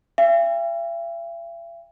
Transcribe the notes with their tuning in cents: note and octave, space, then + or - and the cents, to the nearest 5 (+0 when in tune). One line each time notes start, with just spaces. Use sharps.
E5 +45 G5 +40